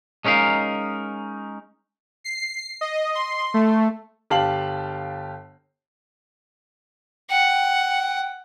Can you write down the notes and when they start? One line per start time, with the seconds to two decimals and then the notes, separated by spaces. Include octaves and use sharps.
0.25 G#3 C#4 D#4 A#4 F5
2.24 C7
2.81 D#5
3.15 C6
3.54 A3
4.30 G1 G4 F5 A5 C7 F#7
7.30 F#5 G5